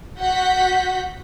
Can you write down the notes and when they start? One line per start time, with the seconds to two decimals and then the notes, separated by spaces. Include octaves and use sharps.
0.18 F#4 F#5 G6 B6